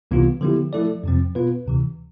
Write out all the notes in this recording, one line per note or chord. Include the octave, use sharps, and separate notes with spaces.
C2 C3 E3 B3 F4
D3 F3 B3 E4 G4
F3 A3 E4 A4 D5
F2 C3 F3 C4
B2 B3 F4 B4
D2 C3 E3